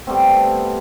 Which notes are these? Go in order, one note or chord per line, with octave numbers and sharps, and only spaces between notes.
G3 A3 B3 C4